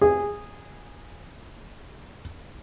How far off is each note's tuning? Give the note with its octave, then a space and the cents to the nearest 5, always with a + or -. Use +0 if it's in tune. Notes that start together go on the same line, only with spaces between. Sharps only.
G#4 -15